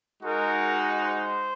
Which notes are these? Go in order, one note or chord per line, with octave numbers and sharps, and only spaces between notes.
G#3 D#4 F#4 A#4
C5